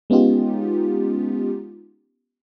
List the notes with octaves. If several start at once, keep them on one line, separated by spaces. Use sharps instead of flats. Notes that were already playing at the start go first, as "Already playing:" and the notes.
G#3 B3 C#4 D#4 F4 G4